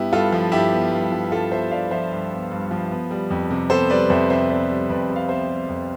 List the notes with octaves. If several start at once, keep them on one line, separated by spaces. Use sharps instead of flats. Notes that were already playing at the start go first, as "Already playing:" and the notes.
Already playing: G2 B3 E4 G4
G2 F4 A4
F3
G2 E4 G4
B3
G2
F3
G2 F4 A4
B3 C5 E5
G2 D5 F5
F3 C5 E5
G2
B3
G2
F3
B3
G3
F2
C3
B3 A4 C5
G3 B4 D5
F2 C5 E5
C3 C5 E5
B3 B4 D5
G3
F2 B4 D5
C3
F5
B3 C5 E5
G3
F2